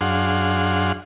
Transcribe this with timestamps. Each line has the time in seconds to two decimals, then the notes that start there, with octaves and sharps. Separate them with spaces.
0.01 F#2 D4 G#4 F5 F#5 C6